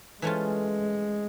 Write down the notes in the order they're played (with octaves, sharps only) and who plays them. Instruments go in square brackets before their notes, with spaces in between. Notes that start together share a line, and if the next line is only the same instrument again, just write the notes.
[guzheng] E3 A3 C#4 F4 [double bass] G#3